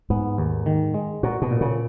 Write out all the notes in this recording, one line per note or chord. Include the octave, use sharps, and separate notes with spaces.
G#2 B3
D#2
D#3
G#3
A#2 F#4
B2
A#2
C#3